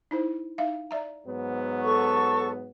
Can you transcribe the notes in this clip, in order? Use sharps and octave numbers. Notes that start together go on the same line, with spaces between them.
D#4 E4 C5
D#4 E5 F5
D5 E5 A#5
G#2 F#3 B3
A4 C#6